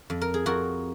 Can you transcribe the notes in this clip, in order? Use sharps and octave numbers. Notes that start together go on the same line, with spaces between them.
F2
A#4
G#4
F2 F#4 A#4